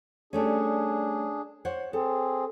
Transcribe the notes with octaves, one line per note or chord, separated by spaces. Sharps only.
G3 A3 C#4 D4 G#4
C5 C#5 F#5
C4 G#4 A4